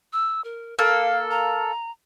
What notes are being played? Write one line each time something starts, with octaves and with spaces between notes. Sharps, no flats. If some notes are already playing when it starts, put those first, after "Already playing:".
E6
A#4
A#3 A4 F5
A#5